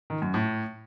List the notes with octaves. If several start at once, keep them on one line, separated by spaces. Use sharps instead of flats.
D#3
F#2
A2